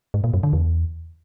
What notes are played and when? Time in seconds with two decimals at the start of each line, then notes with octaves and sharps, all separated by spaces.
0.14 G#2
0.24 A#2
0.34 F#2
0.43 D3
0.53 E2